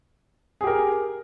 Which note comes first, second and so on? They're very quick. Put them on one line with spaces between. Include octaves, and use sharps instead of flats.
G#4 G4 A#4